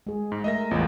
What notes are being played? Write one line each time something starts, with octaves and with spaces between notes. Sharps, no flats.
G#3 G#4
G#2
A3 A#4 D#5 E5 A#6
A1 E2 G#3 B3 F4